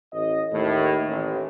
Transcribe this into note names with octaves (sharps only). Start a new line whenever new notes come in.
A1 D#5
D#2 A2
A1